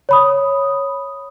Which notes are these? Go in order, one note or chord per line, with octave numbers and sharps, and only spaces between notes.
C#5 B5 D#6